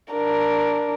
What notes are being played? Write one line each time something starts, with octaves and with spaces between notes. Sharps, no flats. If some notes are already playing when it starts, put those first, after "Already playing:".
D4 A#4